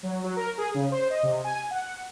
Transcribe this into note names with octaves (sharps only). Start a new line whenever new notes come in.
F#3
F#3
A#4
G#4
C#3
C5
D#5
C3
G#5
F#5